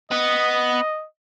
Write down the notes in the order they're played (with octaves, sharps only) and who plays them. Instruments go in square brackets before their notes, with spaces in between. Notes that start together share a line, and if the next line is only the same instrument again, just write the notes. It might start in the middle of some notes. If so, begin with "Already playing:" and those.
[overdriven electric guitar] B3 [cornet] D#5